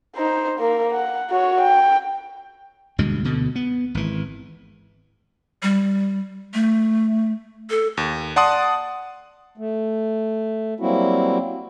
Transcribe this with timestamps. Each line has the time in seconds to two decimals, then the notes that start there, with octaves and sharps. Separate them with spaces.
0.15 D#4 C5
0.60 A#3
0.92 F#5
1.30 F#4 C#5
1.61 G5
2.98 D2 G2 B2 G#3
3.24 D2 B2 D3
3.56 B3
3.95 G#1 E3
5.63 G3
6.54 A3
7.70 A4
7.97 D#2
8.36 D5 F#5 A5 C6 D#6
9.58 A3
10.80 F#3 G3 A#3 C4 E4 F#4